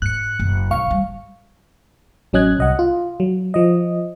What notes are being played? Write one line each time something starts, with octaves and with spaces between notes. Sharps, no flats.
G#2 F#6 C#7
F#1
G#2 F#3 F5 C#6
D3 G3
A1 F#3 C#4 D#5 F#6 G#6
C2 D#5 F#5
F4
F#3
F3 D#5